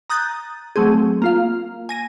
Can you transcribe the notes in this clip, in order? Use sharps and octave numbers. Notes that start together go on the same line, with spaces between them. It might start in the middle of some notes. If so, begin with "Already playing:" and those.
A#5 D#6 F#6 G6 A6
F#3 A3 C4 G#4
A#3 F4 F5
G#5 A#6 D#7